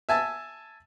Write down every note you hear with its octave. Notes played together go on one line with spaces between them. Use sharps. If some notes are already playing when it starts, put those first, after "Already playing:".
E5 G#5 A5 E6